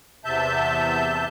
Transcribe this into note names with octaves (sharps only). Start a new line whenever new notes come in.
E2 C3 E5 A5 G6